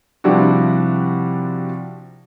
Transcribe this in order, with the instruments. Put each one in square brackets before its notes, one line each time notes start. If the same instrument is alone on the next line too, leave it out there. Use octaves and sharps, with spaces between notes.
[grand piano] C3 F3 G3 D4 E4 F#4